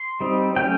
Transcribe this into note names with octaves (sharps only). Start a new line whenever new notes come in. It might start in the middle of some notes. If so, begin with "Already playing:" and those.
Already playing: C6
G3 C4 D#4
F#3 A3 C#4 G5